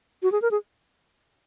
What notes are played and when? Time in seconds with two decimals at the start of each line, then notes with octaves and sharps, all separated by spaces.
0.23 F#4
0.32 G#4
0.42 A#4
0.51 G#4